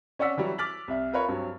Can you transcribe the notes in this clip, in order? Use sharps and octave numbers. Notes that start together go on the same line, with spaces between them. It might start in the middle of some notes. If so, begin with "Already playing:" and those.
C#4 C#5 D5 F#5 E6 B6
E3 F#3 G3
D6 F6 A6 B6 F#7
C2 E5
F4 A#4 B4 C#5
G2 F#3 C4